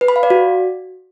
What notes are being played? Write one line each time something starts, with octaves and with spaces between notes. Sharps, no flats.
B4
B5
F5
D5
F#4